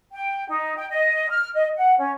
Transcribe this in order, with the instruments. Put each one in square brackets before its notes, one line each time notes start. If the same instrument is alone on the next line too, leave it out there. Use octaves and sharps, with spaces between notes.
[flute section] G5
D#4
G5
D#5
F6
D#5
F#5
C#4